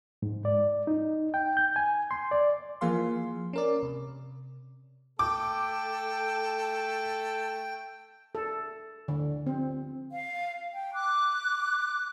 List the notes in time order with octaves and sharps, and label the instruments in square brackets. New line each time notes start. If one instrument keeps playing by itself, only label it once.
[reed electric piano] G#2
D5
D#4
G5
G6
G#5
C6
D5
[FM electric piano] E3 F3 A#3 G#4 F5 C6
C#4 A#4 D5
C3
[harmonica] A3 A4 [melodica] G5 [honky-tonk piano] D6
[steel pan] A4
D3
C4
[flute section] F5
G5
D6 F#6